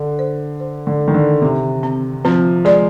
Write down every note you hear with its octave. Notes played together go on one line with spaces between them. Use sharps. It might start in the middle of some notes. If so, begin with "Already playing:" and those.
Already playing: D3 D4
C5
C5
D3
D4
D#3
D3
C3 D#4
C4
F3 C4
G#3 D5